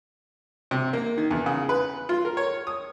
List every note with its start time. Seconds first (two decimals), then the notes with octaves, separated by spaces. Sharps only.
0.71 C3
0.93 A#3
1.18 D#3
1.31 E2
1.46 C#3
1.69 B4
2.09 F4
2.25 A#4
2.37 C#5
2.67 D#6